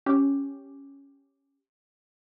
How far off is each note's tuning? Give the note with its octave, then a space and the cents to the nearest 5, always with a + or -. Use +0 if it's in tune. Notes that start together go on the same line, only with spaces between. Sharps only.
C#4 +0 G4 +0